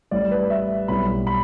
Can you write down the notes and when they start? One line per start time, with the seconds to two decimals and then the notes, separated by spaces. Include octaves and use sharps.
0.11 A1 A2 G3 D5
0.31 B4
0.50 E5
0.88 B1 A2 G3 B3 B5
1.27 B5